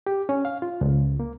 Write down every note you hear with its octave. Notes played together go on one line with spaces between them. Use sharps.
G4
C#4
F5
F4
C#2
A#3